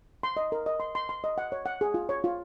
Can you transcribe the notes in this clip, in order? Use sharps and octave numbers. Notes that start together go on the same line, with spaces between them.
C6
D#5
A#4
D#5
C6
C6
C6
D#5
F#5
C#5
F#5
G#4
F4
C#5
F4